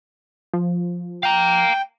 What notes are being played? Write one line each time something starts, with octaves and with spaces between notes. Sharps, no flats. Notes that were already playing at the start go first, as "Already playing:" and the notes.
F3
F5 G5 A#5